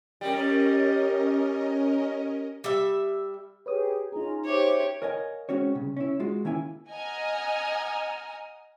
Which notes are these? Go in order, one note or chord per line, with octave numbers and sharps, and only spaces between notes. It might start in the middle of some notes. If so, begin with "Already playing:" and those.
G3 C#4 A#4 D#5
G3 E5
G4 G#4 B4 C#5 D#6
C#4 D#4 F4 G#4 A#5
G4 C5 C#5 E5 D6
A#4 C#5 D#5 F5 G#5
G#3 C4 C#4 F#4 C#5
C2 C#3
C#4 E4
G#3 F4 F#4
D#3 A#3 C#4 E4 G#5
D#5 F#5 G#5 A#5 D#6 F6